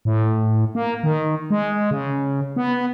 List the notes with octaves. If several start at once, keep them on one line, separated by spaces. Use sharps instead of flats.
A2
A#3
D#3
G#3
C#3
B3